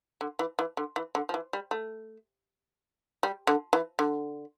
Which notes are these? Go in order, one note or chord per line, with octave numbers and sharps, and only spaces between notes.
D3
E3
E3
D3
E3
D3
F3
E3
G3
A3
G3
D3
E3
D3